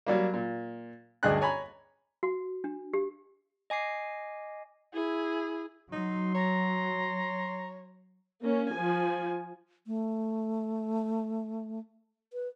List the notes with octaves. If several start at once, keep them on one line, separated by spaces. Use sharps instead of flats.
F#3 G3 A#3
A#2
D2 G2 G#4 D#5 G5 F#6
C#5 G#5 A#5 B5
F#4
D4
G4
D#5 G#5 D6 C7
E4 G#4
F#3 D#4 C6
C#5 A#5
A#3 C#4
F3 G#5
A3
B4